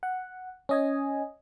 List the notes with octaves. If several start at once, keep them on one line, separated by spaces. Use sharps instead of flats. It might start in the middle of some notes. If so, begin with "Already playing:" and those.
F#5
C#4 D#5 G#5